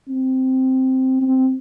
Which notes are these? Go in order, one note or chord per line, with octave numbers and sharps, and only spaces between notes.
C4
C4